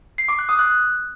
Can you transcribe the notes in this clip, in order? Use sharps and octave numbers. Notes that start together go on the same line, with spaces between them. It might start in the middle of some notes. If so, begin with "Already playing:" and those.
C7
D6
F#6
D#6
F#6